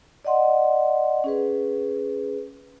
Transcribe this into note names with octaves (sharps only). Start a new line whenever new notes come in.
D5 D#5 F#5 C6
C#4 G#4 B4